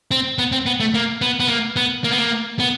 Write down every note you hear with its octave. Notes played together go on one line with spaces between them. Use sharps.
C4
B3
C4
B3
A3
A#3
B3
B3
A#3
B3
A#3
B3
A#3
B3